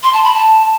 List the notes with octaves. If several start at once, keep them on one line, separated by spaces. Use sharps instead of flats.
C6
A5
B5
A5